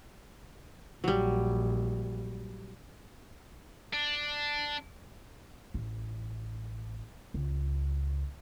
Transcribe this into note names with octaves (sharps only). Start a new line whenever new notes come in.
A#1 F#3 G3
D4
A1
C#2